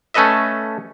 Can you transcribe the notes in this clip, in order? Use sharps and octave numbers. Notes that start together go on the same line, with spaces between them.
A3 C#4 A4 B4 D#5 E5